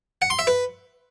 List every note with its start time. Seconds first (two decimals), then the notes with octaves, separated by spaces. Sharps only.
0.22 F#5
0.30 C6
0.39 E5
0.47 B4